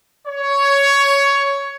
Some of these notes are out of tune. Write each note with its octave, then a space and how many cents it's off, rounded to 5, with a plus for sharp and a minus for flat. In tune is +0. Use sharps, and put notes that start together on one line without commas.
C#5 +10